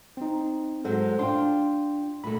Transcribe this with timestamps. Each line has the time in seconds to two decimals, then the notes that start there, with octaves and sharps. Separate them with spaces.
0.17 C4 D#4
0.85 G#2 F#3 G#3 A4 C5 F#5
1.19 D4 F4 G5 C6
2.24 A#2 D3 A3 B5